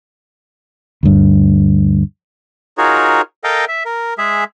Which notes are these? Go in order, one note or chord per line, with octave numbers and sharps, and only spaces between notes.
D2 G2
D#4 F4 F#4 G#4 A#4 C#5
A4 A#4 D#5 F5 G5
E5
A#4
G#3 G#4 E5